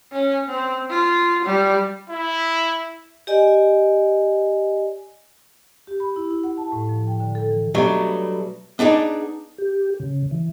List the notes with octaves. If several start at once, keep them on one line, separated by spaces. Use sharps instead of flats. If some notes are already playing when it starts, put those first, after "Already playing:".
C#4
C4
F4
G3
E4
G4 D5 D#5 G#5
G4
B5
E4
E4
F#5
A5
A2
F3
G5
D3
A4
E3
B2 F#3 G3 A3 D4
B3 D4 D#4 G#4 D5
G4
C#3
E3